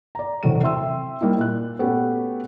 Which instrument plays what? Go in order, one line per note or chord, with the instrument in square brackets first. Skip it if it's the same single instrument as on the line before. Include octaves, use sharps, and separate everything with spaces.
[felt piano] D5 A#5
E1 A2 C3 F#3 A3 D#7
C4 E5 C6 E6
G3 A#3 D#4 E4
A#2 F#6
A3 B3 C#4 F#4 G4 B4